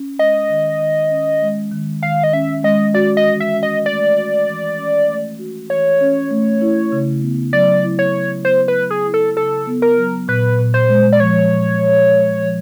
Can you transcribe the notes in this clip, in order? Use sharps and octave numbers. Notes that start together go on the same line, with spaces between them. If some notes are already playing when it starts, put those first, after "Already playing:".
Already playing: C#4
G#3 D#5
D#3
D#3
C#4
G#3
D#3
D#3 F5
D#5
C#4 E5
G#3 D#5
F#4 D5
D#5
E3
E5
C#4
D#5
A3 D5
F#4
E3
C#4
A3
F#4
E3 C#5
C#4
A3
E4
C#3
B3
F#3 D5
E4
C#5
C#3
B3 C5
B4
F#3
G#4
E4
A4
C#3 A4
B3
A#4
F#3
A#2 B4
A#2
C5
G#3
D5
F3 C#5
A#2
A#2
G#3
F3